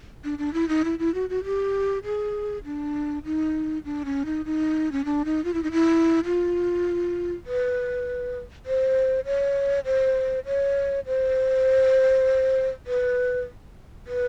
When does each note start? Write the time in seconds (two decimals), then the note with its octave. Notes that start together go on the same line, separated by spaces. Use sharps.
0.24 D4
0.38 D4
0.53 E4
0.69 D#4
0.84 E4
0.99 E4
1.14 F#4
1.29 F#4
1.44 G4
2.04 G#4
2.65 D4
3.24 D#4
3.85 D4
4.05 C#4
4.25 D#4
4.45 D#4
4.92 C#4
5.05 D4
5.25 D#4
5.44 F4
5.54 E4
5.63 D#4
5.72 E4
6.25 F4
7.46 B4
8.66 C5
9.26 C#5
9.85 C5
10.46 C#5
11.06 C5
12.87 B4
14.07 B4